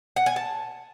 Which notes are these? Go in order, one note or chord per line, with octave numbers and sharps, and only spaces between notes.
F#5
G#5
A5